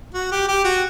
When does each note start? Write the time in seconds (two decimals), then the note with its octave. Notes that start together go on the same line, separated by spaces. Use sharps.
0.14 F#4
0.32 G4
0.48 G4
0.64 F#4